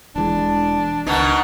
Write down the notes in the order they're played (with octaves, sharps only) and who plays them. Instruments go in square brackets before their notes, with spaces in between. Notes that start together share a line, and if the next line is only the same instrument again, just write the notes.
[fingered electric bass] E1 E3 G#3 [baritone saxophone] D4
[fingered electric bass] C#2 D4 [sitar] B2 D#3 D#4 [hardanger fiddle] F#5 A#5